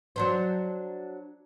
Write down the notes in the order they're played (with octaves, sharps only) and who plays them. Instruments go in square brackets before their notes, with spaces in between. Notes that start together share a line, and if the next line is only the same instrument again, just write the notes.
[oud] F#3 D4 C5